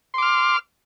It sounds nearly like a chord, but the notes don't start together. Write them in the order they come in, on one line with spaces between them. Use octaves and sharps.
C6 D6 F6